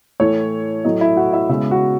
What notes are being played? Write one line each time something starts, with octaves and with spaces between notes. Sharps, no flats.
A2 E3 A3 C#5
A2 F#3 A3 D#5
E4 E5
F#4 F#5
E4 E5
C#3 G#3 B3 E4 E5
F#4 F#5